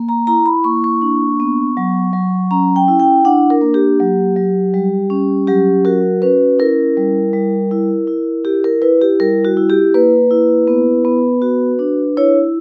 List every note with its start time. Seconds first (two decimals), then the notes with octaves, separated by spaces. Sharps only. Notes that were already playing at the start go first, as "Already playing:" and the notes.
Already playing: A#3
0.09 A#5
0.27 E4 A#5
0.46 B5
0.64 A#3 C#6
0.84 C#6
1.01 D4
1.40 B3
1.77 F#3
2.13 F#3
2.51 C#4 A#5
2.76 G5
2.88 E4
3.00 G5
3.25 D4 F#5
3.50 A#4
3.62 A#3
3.74 G4
4.00 F#3
4.36 F#3
4.74 G3
5.10 C#4
5.47 F#3 G4
5.85 F#4 A#4
6.22 C#4 B4
6.59 E4 A#4
6.97 G3
7.33 G3
7.71 E4
8.07 E4
8.45 E4 G4
8.64 A#4
8.82 E4 B4
9.01 G4
9.20 G3 A#4
9.45 F#4
9.57 E4
9.70 G4
9.94 A#3 B4
10.31 E4
10.67 B3
11.05 B3
11.42 F#4
11.79 D4
12.17 E4 C#5